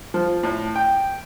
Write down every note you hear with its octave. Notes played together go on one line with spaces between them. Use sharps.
F3
A2
G5